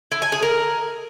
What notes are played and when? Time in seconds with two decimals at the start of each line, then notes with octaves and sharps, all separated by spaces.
0.12 E4
0.22 G#5
0.32 G#4
0.42 A#4